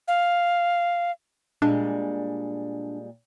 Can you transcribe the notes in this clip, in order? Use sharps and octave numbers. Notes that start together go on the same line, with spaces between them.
F5
A#2 G3 G#3 D4